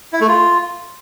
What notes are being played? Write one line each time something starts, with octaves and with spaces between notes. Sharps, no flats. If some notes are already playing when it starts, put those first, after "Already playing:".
E4
A3
F4